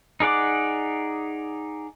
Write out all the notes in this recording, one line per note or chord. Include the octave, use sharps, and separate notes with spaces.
D#4 G#4 D5 F#5 D6